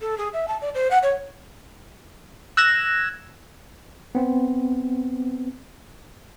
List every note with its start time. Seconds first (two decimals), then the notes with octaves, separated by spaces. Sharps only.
0.01 A4
0.18 G#4
0.33 E5
0.48 A5
0.62 D5
0.75 C5
0.91 F#5
1.03 C#5
2.57 E6 F#6 G#6 A#6 E7
4.15 B3 C4